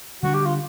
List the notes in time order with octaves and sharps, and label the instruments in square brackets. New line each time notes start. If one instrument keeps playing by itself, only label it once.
[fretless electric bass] D3 G3 B3 D4 [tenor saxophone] F#4
[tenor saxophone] G4
F4